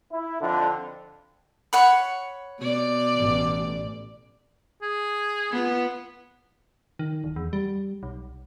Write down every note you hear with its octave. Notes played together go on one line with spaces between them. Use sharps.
E4
F2 D3
C#5 F#5 B5
B2 D5
A1
G#4
B3 F4
D#3
D1
E2
G3
B1